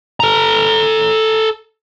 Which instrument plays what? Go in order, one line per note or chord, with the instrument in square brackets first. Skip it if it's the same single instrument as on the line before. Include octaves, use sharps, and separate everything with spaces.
[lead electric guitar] A4 A#5